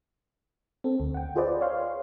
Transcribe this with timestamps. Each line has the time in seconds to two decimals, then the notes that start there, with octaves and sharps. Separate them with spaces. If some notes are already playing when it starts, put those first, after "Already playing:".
0.84 C4 A4
1.00 D2
1.14 F#5 G5
1.36 F4 G#4 B4 C5 D5 D#5
1.61 C#5 F5 C6